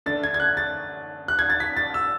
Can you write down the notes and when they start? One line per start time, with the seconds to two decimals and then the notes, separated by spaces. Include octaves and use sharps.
0.06 D3 A3 D4 A6
0.24 G#6
0.34 G#6
0.40 F#6
0.57 A6
1.28 F#6
1.39 G#6
1.50 A6
1.60 B6
1.77 A6
1.94 E6